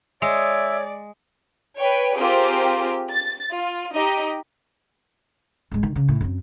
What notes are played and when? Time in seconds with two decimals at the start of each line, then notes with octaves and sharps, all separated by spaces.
0.22 G#3 C#5 D5 E5
1.80 B4 C#5 G5
2.16 C4 F4 G4 G#4 A#4 C5
3.09 A6
3.53 F4
3.93 D#4 G4 D#5
5.71 G#1 G#3
5.83 D#3
5.96 C#3
6.08 A2
6.21 F#2 C4